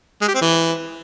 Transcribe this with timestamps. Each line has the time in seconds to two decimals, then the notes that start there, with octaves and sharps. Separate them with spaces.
0.21 G#3
0.28 G4
0.35 C4
0.41 E3